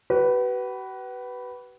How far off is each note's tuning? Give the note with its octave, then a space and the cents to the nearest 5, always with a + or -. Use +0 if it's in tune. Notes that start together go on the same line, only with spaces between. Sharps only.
F#4 +45 B4 +0